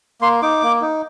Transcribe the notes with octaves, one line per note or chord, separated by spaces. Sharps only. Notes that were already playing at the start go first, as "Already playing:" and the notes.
A#3 C6
D#4 D6
A#3
D#4